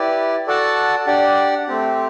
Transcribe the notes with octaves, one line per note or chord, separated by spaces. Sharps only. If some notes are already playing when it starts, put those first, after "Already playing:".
Already playing: E4 G4 B4 D5
F#4 A4 D5 F#5 A5
D4 G4 D5 F#5
A3 C4 G4